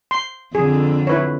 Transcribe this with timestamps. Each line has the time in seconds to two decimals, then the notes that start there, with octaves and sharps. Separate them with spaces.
0.11 C6
0.55 F2 D3 G#4
1.07 E4 B4 C#5